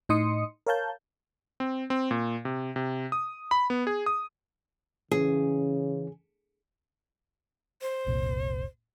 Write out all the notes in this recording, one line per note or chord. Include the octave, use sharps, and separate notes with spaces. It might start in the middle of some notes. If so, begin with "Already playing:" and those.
A2 D#4 D#5 C6 D#6 C#7
A#4 C#5 F5 A5 G6
C4
C4
A#2
C3
C3
D#6
B5
B3
G#4
D#6
C#3 E3 C#4 G#4
C5
F1 C2 A#2